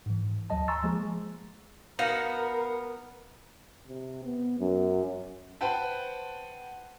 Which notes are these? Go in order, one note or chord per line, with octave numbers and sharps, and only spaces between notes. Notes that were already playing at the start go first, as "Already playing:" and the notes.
G#2 E3
D2 F#3 D#5 A5
G#5 A#5 C6 C#6 E6 A6
F3 G#3 A#3 G#4
B3 D#4 F#4 A#4 F5
C3
B3
F#2
B4 C5 F#5 G5 A5